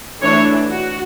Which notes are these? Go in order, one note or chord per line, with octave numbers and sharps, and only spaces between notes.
E3 A3 D4 C#5
F#4